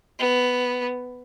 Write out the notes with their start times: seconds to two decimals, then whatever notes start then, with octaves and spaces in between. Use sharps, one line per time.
0.19 B3